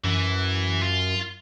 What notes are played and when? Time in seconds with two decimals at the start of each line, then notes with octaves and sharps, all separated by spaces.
0.04 F#2 E3
0.82 F4